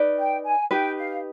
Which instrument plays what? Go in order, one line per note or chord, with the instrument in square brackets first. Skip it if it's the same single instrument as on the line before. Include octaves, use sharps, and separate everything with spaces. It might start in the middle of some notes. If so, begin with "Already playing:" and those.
Already playing: [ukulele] D#4 B4 D5
[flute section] G5
G#5
[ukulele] D#4 G4 B4 [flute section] G5
[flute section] F5